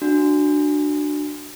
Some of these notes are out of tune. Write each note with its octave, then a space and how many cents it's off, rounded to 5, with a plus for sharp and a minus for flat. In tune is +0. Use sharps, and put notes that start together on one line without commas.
D4 +15 F#4 +0